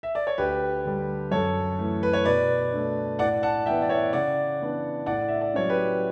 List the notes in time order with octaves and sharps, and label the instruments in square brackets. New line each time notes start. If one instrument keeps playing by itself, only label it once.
[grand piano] E5
D5
C#5
D2 G4 B4
D3 G3
F#2 A4 C#5
E3 A3
B4
C#5
B2 B4 D5
A3 D4
A2 D5 F#5
F#5 A5
E3 E5 G5
B3
D5
C#5 E5
C#3 D5 F#5
E3 B3 D4
A2 D5 F#5
E5
D5
F#3 C#4 C#5
G4 B4